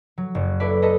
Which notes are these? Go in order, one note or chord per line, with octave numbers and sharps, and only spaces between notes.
F#3
F#1
E4 A4 B4 D5 B5
A4 B4 D#5 A#5